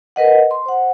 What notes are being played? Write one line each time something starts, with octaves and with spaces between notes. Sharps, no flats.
A#4 B4 D#5 F#5
C6
C5 F#5